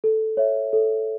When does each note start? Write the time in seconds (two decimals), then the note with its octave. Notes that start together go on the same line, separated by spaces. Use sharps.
0.04 A4
0.37 C#5 E5
0.73 A4